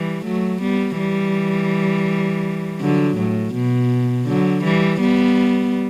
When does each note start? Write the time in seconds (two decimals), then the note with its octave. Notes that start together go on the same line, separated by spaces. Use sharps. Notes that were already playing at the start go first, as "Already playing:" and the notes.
Already playing: E3 G3
0.25 F#3 A3
0.62 G3 B3
0.98 E3 G3
2.81 D3 F#3
3.18 A2
3.54 B2
4.27 D3 F#3
4.64 E3 G3
5.00 G3 B3